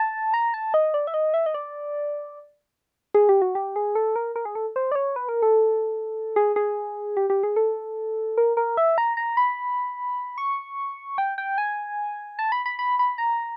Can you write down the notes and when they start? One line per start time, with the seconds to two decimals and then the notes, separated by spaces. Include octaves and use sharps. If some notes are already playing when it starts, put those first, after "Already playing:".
Already playing: A5
0.34 A#5
0.54 A5
0.74 D#5
0.94 D5
1.07 E5
1.14 D#5
1.34 E5
1.46 D#5
1.54 D5
3.15 G#4
3.29 G4
3.42 F#4
3.55 G4
3.76 G#4
3.95 A4
4.16 A#4
4.36 A#4
4.45 G#4
4.55 A4
4.76 C5
4.92 D5
4.95 C#5
5.16 B4
5.29 A#4
5.42 A4
6.36 G#4
6.56 G#4
7.17 G4
7.30 G4
7.43 G#4
7.56 A4
8.38 A#4
8.57 A#4
8.77 E5
8.98 A#5
9.17 A#5
9.37 B5
10.38 C#6
11.18 G5
11.38 G5
11.58 G#5
12.39 A5
12.52 B5
12.66 B5
12.79 B5
12.99 B5
13.18 A#5